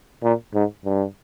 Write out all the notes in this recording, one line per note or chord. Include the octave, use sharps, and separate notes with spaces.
A#2
G#2
G2